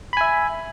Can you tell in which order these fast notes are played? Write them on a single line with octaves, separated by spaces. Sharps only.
B5 G#5 E5